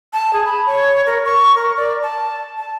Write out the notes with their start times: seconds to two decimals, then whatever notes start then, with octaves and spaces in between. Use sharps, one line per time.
0.13 A5
0.33 G#4
0.46 B5
0.66 C#5
1.06 A#4
1.25 C#6
1.55 A#4
1.77 D5
2.03 A5
2.57 A5